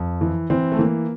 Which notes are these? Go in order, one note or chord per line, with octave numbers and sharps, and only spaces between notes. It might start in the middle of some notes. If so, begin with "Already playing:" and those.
Already playing: F2
E3
E3 C4
A3
E3 A#3